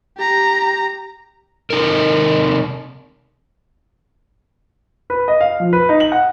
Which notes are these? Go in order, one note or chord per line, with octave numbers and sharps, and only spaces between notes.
G4 A#5
C3 D#4 A4 A#4
B4
D#5
F5
F3
B4
D#4
F#7
F#5